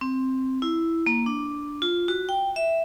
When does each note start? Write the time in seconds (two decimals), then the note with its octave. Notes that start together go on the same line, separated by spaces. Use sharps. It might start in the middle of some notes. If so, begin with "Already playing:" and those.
0.01 C4
0.62 E4
1.06 A#3
1.26 D4
1.82 F4
2.08 F#4
2.29 G5
2.56 E5